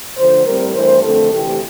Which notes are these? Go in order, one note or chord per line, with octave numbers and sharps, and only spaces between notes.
D2 D3 F3 C5
A2 G3 C4 A#4
G2 E3 A3 C5
F2 D3 A3 C4 A4
D2 C3 E3 A3 G4